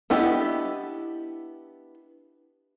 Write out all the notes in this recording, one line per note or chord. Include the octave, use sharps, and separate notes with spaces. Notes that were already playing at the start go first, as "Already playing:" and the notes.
B3 D4 E4 G4 D#5